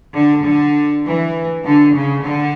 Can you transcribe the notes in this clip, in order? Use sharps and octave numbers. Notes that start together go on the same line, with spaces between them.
D3
D3
E3
D3
C#3
D3